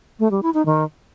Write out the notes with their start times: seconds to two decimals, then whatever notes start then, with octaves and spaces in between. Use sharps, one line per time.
0.20 A3
0.31 G3
0.43 E4
0.54 D#4
0.66 D#3